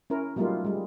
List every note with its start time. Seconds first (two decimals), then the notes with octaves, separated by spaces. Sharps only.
0.10 C#4 E4 A#4
0.36 F#3 G3 A3 A#3 D#4 F4
0.65 G3 G#3